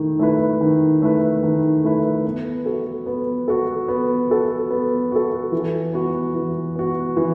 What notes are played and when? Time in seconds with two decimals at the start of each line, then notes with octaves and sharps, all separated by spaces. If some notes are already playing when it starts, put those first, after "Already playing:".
Already playing: D#3 A3 E4
0.19 A3 E4 B4
0.61 D#3
1.02 A3 E4 B4
1.43 D#3
1.84 A3 E4 B4
2.25 B3
2.66 F#4 A4
3.06 B3
3.48 F#4 A4
3.88 B3
4.30 F#4 A4
4.71 B3
5.12 F#4 A4
5.52 E3
5.93 B3 F#4
6.35 E3
6.76 B3 F#4
7.17 E3